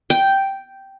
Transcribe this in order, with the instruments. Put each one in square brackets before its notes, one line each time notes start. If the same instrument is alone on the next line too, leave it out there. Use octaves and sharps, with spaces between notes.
[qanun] G5